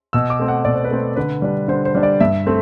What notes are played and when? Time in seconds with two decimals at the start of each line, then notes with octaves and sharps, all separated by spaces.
0.13 B2 E6
0.30 D6
0.39 A3 C4
0.48 F#5
0.65 B2 D5
0.75 C5
0.84 B4
0.91 A3 C4 C5
1.16 D3 B4
1.42 G3 D4
1.68 D3 C5
1.85 C5
1.95 G3 D4
2.03 D5
2.20 G2 E5
2.47 A3 C4